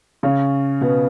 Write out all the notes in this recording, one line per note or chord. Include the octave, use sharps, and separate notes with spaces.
C#3 C#4
B2 B3